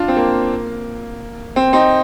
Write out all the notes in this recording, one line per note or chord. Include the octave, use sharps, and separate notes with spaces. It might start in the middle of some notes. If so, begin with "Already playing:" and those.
Already playing: D4 F4
C4
A#3
C4
C4 D#4